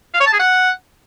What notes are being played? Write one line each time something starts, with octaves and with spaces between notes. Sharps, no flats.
F5
C#5
A5
G#4
F#5